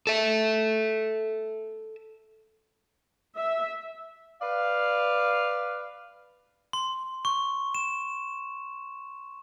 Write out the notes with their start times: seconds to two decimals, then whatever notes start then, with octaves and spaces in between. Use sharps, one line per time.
0.07 A4 E5
3.38 E5
4.42 B4 D5 F5
6.73 C6
7.25 C#6
7.75 E7